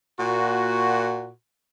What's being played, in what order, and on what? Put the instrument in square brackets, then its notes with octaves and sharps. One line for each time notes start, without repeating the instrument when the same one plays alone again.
[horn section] A#2 F#4